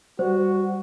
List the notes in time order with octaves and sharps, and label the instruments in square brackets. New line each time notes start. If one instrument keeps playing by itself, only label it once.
[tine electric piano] G3 [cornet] F#4 [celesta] C5